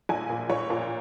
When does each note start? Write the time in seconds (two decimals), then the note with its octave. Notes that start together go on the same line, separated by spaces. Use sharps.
0.09 A#1 G#5
0.30 A#2
0.50 A#1 C#5
0.70 A#2